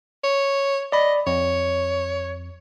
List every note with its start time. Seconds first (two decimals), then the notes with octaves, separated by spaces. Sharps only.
0.23 C#5
0.92 D5 D#5 B5
1.27 F2 C#5